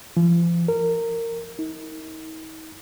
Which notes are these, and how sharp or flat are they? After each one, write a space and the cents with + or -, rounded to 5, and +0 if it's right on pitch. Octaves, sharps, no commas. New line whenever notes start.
F3 -40
A#4 -20
D#4 +40